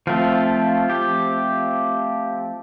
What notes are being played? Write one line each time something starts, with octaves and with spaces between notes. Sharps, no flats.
F3 A3 C4 F4
G4